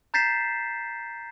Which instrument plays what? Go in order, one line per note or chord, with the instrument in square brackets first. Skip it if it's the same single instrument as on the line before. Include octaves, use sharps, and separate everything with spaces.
[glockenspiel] A#5 G6 A6 B6 C7 E7